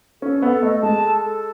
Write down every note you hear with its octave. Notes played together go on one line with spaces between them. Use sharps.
C#4 A4
B3 A4
A3 D#5
G#3 A5
A4
A4